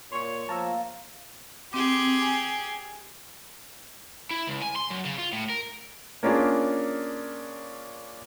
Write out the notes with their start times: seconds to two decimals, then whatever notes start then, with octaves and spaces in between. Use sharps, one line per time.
0.12 A#2 C#5 C6 C#6
0.49 F3 A#3 A5 A#5 E6
1.73 C4 G4 G#4 D6
2.22 G#5
4.31 E4
4.48 C#2
4.62 G#5
4.76 C6
4.91 F#2
5.05 C#3
5.19 F4
5.33 A2
5.50 A#4
6.23 A#3 C#4 D4 F4 G#4